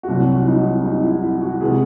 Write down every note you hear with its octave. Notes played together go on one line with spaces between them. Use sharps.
F#4
C2 C3 F#3 E4
F#4
D#4
E4
D#4
E4
E4
F#4
C3 E3 G#3 G#4